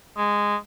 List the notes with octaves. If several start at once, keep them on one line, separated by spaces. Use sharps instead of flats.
G#3